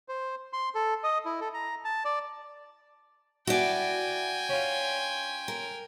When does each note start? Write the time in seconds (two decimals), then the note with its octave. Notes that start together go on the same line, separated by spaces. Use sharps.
0.09 C5
0.53 C6
0.75 A4
1.04 D#5
1.25 E4
1.41 A4
1.54 A#5
1.84 A5
2.05 D5
3.47 E4 F#4 D5 G5 G#5
4.49 C#4 F4
5.48 A#4